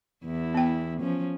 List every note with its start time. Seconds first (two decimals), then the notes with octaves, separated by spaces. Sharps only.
0.25 E2 E4
0.54 B3 G5
1.00 F3 C#4